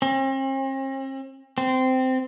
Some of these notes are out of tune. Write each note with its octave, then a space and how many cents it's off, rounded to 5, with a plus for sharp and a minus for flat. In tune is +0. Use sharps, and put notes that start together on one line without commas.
C4 +45
C4 -15